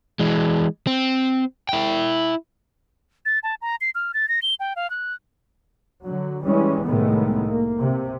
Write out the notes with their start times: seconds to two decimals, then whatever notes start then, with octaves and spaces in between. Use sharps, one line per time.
0.20 E3 G#3
0.87 C4
1.69 E4 G5
3.26 A6
3.43 A5
3.62 A#5
3.81 C7
3.95 F6
4.14 A6
4.29 A#6
4.42 G7
4.60 G5
4.76 F5
4.90 F#6
6.04 D3 F#3
6.45 E3 G3 G#3 C#4
6.86 C2 A2 D#3 G#3 A3 B3
7.47 A#3
7.78 C3